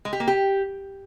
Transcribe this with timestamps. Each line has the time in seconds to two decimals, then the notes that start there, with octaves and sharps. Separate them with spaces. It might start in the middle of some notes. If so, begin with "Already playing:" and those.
0.05 G#3
0.13 G4
0.20 A#3
0.28 G4